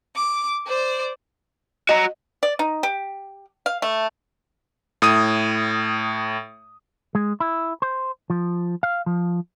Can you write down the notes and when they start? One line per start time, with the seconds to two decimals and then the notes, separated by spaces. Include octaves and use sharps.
0.15 D6
0.67 C5 D5
1.89 F#4 D#5 A#5
2.43 D5
2.59 D#4
2.83 G4
3.66 F5
3.82 A3
5.02 A2 D#6 D#7
7.15 G#3
7.40 E4
7.82 C5
8.30 F3
8.83 F5
9.06 F3